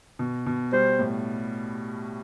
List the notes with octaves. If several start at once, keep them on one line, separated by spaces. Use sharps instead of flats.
B2
B2
G3 C5
A2